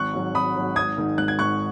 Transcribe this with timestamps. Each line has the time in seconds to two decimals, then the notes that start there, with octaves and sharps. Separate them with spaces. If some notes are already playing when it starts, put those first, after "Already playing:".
Already playing: G#1 C#6 F#6
0.13 G#2 F#3
0.34 G#1 B5 D#6
0.56 G#2 F#3
0.76 G#1 D#6 G#6
0.98 G#2 D#3
1.18 G#1 F#6
1.28 G#6
1.39 G#2 D#3 C#6 F#6